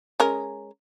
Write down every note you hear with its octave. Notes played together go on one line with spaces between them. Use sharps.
G#3 C#4 A#4